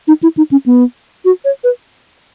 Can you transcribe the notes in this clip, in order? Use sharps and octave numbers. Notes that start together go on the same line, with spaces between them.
D#4
E4
D#4
C#4
B3
F#4
C#5
B4